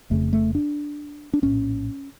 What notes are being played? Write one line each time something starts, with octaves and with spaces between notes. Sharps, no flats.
F1 F2 C#3 A3
A3
D4
D4
A#1 A2 C#4